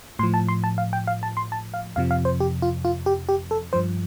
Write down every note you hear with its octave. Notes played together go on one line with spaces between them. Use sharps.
A2 F3 C6
A5
C6
A5
F5
G5
F5
A5
C6
A5
F5
F2 C3 F3 F5
F5
C5
G4
F4
F4
G4
G4
A4
G2 F3 C5